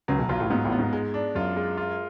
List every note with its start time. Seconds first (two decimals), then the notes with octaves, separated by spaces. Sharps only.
0.08 C#2 C#3 F#3
0.19 B1 B2
0.29 B1 B2 F4
0.40 A1 A2
0.50 G#2 B3
0.65 A1 A2
0.72 B3
0.79 G#2
0.93 G#3
1.14 D4
1.35 F#2 F4
1.56 G#3
1.77 F4